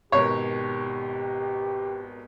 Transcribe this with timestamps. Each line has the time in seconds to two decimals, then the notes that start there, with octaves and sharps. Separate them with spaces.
0.12 G#1 B2 G4 A#4 C#5